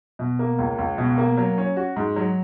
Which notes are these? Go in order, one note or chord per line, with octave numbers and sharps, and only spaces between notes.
B2
A#3
C#2
C#2
B2
A#3
F#3
C#4
F#4
G#2
F#3